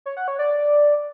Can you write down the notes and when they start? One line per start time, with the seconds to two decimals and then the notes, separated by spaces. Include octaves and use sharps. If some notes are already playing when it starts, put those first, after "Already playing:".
0.06 C#5
0.17 F#5
0.28 C#5
0.39 D5